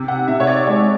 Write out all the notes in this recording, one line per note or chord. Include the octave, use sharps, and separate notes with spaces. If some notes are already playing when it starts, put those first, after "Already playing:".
Already playing: C3
F#5
C3 E5
C#5
D5
G#3 C#5